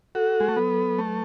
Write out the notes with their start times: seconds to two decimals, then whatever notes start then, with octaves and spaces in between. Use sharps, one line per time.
0.15 F#4 A4
0.40 G#3
0.48 A3
0.57 F#3 B3
0.98 A3 B4